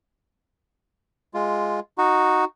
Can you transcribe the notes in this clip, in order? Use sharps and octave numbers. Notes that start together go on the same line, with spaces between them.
G#3 F4
D#4 F#4